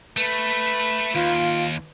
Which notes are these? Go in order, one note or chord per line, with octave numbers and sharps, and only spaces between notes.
A3 B4 B5
D#2 F4